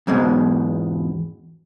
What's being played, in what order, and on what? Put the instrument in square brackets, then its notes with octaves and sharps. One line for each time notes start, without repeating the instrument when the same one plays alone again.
[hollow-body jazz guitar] E2 G#2 B2 G#3